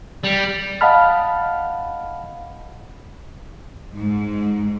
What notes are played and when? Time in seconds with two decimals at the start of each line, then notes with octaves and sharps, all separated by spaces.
0.24 G3
0.81 D#5 F5 F#5 A5 B5 F6
3.95 G#2